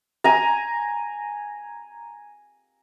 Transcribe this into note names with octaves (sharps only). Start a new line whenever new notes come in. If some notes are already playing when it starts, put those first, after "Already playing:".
G#5 A#5